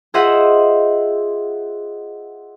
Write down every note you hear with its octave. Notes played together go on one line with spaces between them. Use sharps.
F4 G#4 C5 D#5 E5 F#5